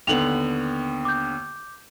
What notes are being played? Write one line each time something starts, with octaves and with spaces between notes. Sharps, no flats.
D#2 D3 B3 F7 F#7
D6 G6